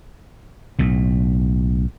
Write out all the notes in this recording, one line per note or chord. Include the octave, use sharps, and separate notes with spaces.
B1 A2